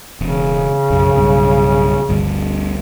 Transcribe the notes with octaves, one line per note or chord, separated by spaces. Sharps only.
E1 C#3
B1 F#2
B1 G2
G1 D2 G2